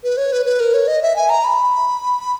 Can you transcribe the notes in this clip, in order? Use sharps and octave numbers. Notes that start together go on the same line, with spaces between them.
B4
C#5
B4
B4
A#4
C#5
D#5
E5
G#5
A#5
B5